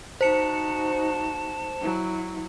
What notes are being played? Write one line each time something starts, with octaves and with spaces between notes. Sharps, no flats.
D#4 F#4 C5 A5 C#7
F#3 E4